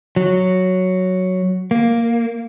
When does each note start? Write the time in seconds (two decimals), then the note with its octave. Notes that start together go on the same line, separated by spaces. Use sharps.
0.16 F#3
1.71 A#3